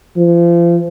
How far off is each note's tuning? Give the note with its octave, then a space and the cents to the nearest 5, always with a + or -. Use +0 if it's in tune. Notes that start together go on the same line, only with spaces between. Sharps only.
F3 -35